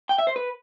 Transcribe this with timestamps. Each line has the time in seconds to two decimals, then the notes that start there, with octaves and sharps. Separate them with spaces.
0.09 G5
0.18 E5
0.27 C5
0.36 B4